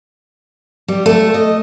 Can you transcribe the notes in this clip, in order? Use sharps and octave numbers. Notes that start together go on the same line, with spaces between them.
G3
A3
D#5